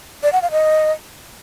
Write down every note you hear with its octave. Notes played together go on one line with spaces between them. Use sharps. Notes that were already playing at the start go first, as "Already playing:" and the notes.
D5
F#5
F5
D#5